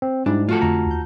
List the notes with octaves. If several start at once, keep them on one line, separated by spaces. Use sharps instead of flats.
C4
G#2 G3 D4 E4
F3 A3 F4 F#4 A4
F2 D3 A3 A#5
D#2 G6